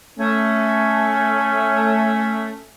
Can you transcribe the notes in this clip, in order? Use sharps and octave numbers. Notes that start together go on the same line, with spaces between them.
A3 C#4